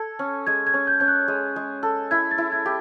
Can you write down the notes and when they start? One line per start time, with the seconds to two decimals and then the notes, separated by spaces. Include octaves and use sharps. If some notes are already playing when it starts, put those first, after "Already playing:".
Already playing: A4 G#6
0.19 C#4
0.47 G#3 G#6
0.67 G#6
0.74 C#4
0.87 G6
1.00 C#4 G6
1.08 F#6
1.28 G#3
1.56 G#3
1.83 A4
2.11 E4 G#6
2.31 A6
2.38 E4
2.52 G#6
2.66 G4